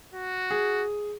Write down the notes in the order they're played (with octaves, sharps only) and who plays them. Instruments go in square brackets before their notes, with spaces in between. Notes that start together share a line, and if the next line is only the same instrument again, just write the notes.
[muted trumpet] F#4
[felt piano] G#4